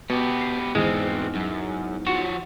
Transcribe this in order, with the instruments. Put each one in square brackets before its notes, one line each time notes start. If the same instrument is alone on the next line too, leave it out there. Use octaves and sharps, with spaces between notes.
[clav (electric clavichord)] B2 [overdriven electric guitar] B3 G4
[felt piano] C7
[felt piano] E2 G#2 F6 [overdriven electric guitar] E3 C4 [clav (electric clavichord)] G#3
[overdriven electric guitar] F#2
[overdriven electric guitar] F3 C#5 [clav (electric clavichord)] F#4